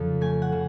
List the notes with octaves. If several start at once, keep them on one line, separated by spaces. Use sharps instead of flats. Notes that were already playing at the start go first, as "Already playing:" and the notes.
Already playing: F2 C#3 F3
A3 G#5
F#5
C#3